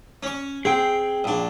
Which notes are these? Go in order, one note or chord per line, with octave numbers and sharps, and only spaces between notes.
C#4 C#6
C4 G#4 G5
A#1 D4